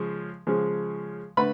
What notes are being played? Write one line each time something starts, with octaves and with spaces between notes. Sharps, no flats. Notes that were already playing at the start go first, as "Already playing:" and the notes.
Already playing: C#3 F3 G#3
C#3 F3 G#3
D3 A3 B4 B5